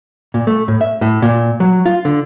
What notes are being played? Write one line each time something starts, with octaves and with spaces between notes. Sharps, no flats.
A#2
A3
A2
E5
A2
A#2
F#3
F4
D3